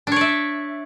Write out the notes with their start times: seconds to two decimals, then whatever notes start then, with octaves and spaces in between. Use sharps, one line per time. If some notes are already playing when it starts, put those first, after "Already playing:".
0.07 D4
0.12 C#5
0.16 D5
0.21 E5